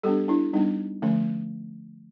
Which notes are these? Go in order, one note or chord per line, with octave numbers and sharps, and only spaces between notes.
G3 B3 D4 G4 A4
D4 E4
G3 B3 D4 D#4
D3 F3 A3 C#4